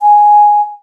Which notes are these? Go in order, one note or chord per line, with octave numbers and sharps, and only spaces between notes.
G#5